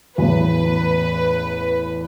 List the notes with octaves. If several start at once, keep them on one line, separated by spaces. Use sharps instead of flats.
A1 E2 B4